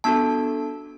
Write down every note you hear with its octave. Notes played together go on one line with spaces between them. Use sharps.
B3 D4 F#4 A4 A5